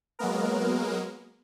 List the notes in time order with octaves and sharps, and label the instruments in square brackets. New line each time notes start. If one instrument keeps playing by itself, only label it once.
[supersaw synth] F#3 G#3 A#3 B3 A#4